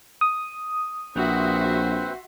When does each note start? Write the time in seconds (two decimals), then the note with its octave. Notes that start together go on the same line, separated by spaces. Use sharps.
0.21 D#6
1.16 A#1 C4 F#4 B4 C5 E5 C6